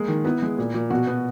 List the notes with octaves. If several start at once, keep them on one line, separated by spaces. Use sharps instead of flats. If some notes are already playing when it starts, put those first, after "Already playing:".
Already playing: G#3 A#3 G#4
D#3
B3 E4
G#3
A#2
A#2
B2 F#4
B3